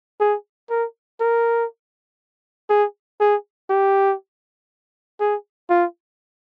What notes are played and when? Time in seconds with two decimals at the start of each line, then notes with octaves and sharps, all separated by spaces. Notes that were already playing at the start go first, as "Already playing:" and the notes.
0.20 G#4
0.70 A#4
1.20 A#4
2.69 G#4
3.20 G#4
3.69 G4
5.20 G#4
5.70 F4